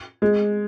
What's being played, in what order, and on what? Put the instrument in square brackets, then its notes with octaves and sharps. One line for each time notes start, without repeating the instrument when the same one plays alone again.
[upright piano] G#3